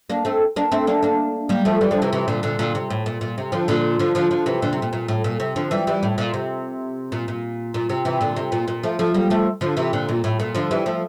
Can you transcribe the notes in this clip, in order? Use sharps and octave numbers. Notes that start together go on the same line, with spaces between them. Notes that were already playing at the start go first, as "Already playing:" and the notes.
A#3 D4
A3 C4
A#3 D4
A3 C4
A#3 D4
A#3 D4
G3 A#3
F3 A3
E3 G3
D3 F3
C3 E3
C3 E3
A#2 D3
A#2 D3
A#2 D3
C3
A2
A#2
A#2
C3
D3 F3
A#2 D3
D3 F3
D3 F3
D3 F3
C3 E3
A#2 D3
C3
A#2
A#2
A2
A#2
C3
D3 F3
E3 G3
E3 G3
A2
A#2
C3
A#2
A#2
A#2
C3
C3 E3
A#2 D3
C3
A#2
A#2
F3 A3
F3 A3
G3 A#3
F3 A3
D3 F3
C3 E3
A#2 D3
A#2
A2
A#2
D3 F3
E3 G3
F3 A3